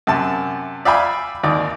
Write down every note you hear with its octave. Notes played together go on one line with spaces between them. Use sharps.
F#2 C3 A5
D5 E5 F5 G5 G#5 B5
G#1 D#2 D5